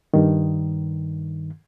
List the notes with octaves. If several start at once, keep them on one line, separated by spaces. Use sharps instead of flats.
G2 D#3